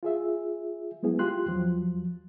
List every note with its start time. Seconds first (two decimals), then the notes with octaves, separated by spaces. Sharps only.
0.03 F4 G#4 E5
1.03 F#3 G#3 B3 E4 G#4
1.19 F4 G4 C6 F#6
1.46 E2 F3 F#3